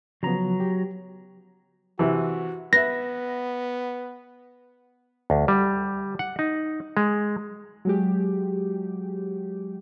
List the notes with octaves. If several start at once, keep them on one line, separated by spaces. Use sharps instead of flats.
C#3 F3 F#3 B3 A#5
G4
C3 E3 F#4
B3 B4 E5 A#6
D2
G3
F#5
D#4
G#3
F#3 G#3 G4